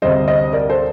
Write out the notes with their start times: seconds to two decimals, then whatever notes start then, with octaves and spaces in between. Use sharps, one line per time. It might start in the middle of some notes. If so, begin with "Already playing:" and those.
0.02 D2 C3 G3 C5 D#5
0.27 C5 D#5
0.52 A#4 D5
0.70 A4 C5